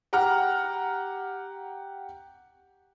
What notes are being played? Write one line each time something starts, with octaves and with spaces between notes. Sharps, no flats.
G4 F#5 A#5 F6